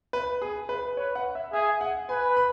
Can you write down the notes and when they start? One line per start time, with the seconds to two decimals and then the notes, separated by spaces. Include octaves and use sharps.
0.13 B4
0.42 G#4
0.69 B4
0.97 B4 C#5
1.15 F#5
1.35 E5
1.53 G#4 E5
1.81 F#5
2.09 B4 G#5
2.37 B5